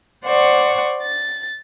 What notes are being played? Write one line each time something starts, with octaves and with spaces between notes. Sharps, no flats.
C5 D5 F#5 C#6
A6